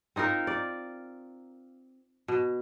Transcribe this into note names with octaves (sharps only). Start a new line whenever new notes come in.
C4 D#4 F4 A#4
D5
B2